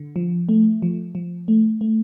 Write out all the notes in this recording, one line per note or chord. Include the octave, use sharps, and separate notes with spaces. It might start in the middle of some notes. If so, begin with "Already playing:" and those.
Already playing: D3
F3
A3
F3
F3
A3
A3